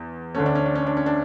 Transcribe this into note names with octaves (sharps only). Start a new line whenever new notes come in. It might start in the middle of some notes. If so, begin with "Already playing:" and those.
Already playing: E2
D2 D3 A3 C#4
D4
C#4
D4
C#4
D4
C#4
D4